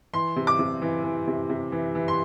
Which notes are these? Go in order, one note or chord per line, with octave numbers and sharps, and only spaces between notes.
E3 C6
C3
D6
C3
E3
E3
C3
C3
E3
E3
C6